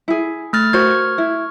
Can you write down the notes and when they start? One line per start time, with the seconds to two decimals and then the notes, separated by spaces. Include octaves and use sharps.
0.08 E4 G#4
0.53 A3 F6 A6
0.73 F#4 A#4 C5 C#6 F6 G#6
1.18 E4